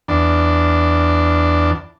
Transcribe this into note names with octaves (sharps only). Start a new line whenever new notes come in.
E2 D4